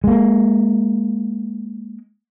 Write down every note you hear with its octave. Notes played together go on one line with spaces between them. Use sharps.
G#3 A#3